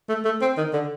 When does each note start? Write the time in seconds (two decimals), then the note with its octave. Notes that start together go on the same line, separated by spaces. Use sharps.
0.09 A3
0.25 A3
0.42 C4
0.58 D#3
0.73 D3